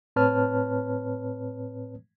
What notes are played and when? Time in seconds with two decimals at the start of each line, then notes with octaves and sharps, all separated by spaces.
0.16 A2 C4 B4 C#5 A5 F6